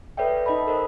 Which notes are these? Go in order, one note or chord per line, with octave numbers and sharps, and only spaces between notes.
A4 B4 C#5 D5 E5 G5
D#4 D#5 A5 B5
A4 A#4 C5 D#5